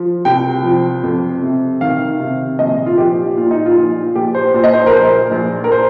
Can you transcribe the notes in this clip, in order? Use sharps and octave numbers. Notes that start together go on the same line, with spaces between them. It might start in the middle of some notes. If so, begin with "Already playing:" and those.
Already playing: F3
C2 G5
F3
F2
C3
D#3 F5
C3
A#1 D#5
F4
F3 G4
A#2 F4
D#4
F4
A#1
A#1 G4
C5
A#2 C5
D#5
C5
A#4
A#1 C5
A#1
A#4
C5